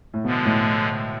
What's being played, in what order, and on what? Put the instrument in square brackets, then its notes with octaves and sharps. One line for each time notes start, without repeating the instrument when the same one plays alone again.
[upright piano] A2
[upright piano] B2 [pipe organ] D3 F3 G#3
[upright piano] A2